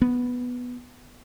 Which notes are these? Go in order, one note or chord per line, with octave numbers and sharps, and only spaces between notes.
B3